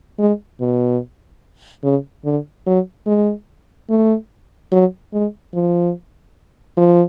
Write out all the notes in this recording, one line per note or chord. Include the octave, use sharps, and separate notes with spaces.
G#3
B2
C#3
D3
F#3
G#3
A3
F#3
G#3
F3
F3